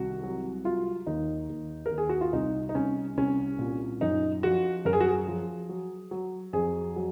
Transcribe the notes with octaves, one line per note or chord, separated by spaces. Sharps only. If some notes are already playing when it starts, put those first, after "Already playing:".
Already playing: C2 D#3 F#4
F#3
F#3 F4
D#2 D#4
D#2
A#4
D#2
G#4
F#4
F4
C2 D#4
D#4
C2 C#4
C2 C#4
A#2
F#2 D#4
F3 F#4
F#2 A#4
G#4
F#4
G#4
F3
F#3
F#3
F2 G#4
F#3